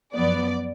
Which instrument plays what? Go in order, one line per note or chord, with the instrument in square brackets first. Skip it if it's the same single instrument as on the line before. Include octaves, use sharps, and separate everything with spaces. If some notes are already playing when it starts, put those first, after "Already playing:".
[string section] F#2 F3 B3 D5